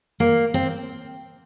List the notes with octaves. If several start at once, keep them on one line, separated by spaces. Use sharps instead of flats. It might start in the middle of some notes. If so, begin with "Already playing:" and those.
A#3
C4